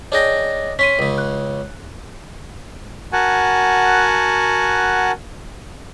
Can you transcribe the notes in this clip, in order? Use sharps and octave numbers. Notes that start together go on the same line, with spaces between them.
D4 G#4 C#5 D#5 G5 A#6
C#4 C6 B6 D#7
C#2 C#3
F#6
F#4 A#4 F#5 G#5 A5